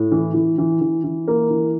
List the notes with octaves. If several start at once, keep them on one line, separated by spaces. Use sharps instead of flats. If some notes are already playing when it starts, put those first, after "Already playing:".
Already playing: A2
E3
E3
E3
E3
E3
A#3
E3